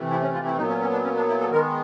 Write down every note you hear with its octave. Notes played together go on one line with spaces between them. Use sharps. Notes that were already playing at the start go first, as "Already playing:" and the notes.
Already playing: C3 E3 A3
E4
C#4
F4
E4
A#2 F#3 B3 D#4
C#4
C#4
D4
C#4
D4
E4
A4
D#3 G#3 B3 A#4